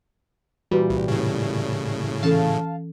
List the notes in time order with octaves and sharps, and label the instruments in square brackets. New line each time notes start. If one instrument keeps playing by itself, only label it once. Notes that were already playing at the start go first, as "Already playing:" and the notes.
[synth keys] A#2 E3 G3 [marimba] F#4 B4
[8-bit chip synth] C2
A2 C#3
[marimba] E3 C#4 A4 [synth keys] F5 A5